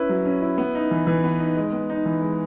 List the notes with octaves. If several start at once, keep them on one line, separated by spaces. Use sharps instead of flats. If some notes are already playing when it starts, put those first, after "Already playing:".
Already playing: C#4 E4 B4
F#3
C#4
E4
B3
D#4
E3
E3
B3
D#4
G#3
B3
D#4
E3
G#3